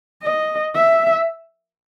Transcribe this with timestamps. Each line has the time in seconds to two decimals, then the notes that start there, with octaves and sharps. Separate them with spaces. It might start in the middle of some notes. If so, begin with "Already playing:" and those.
0.23 D#5
0.75 E5